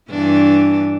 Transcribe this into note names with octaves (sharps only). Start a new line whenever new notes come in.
G2 E3 D4